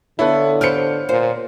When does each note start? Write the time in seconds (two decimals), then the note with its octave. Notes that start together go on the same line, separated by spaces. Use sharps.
0.19 D3 B3 E4 F4 A4 B4 C#5
0.61 G4 B4 C5 F6 C#7
1.09 A#2 C5